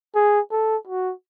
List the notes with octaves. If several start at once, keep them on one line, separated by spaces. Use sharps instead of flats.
G#4
A4
F#4